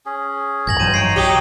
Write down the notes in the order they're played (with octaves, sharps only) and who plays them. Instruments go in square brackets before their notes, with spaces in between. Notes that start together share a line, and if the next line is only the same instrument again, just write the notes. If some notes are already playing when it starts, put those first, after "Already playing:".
[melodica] C#4 G#4
[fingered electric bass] A1 G2 [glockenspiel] G#6 A#6 F#7
[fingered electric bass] G2 E3 F#3 [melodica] C5 [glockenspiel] D#7 E7
[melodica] D#4 C#5 A#5 [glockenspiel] C7 D7
[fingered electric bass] B1 [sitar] F#3 G4 [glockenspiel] D#6 E7